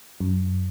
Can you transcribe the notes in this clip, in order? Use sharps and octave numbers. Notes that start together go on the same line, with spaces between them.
F#2